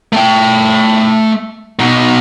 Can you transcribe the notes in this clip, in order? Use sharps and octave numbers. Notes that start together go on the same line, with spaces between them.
A3 G5
B2 D#4